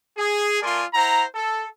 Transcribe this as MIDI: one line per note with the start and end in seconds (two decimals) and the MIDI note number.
0.17 0.58 68
0.62 0.84 57
0.62 0.84 65
0.62 0.84 70
0.62 0.84 74
0.62 0.84 80
0.62 0.84 84
0.94 1.24 64
0.94 1.24 72
0.94 1.24 78
0.94 1.24 82
1.35 1.64 69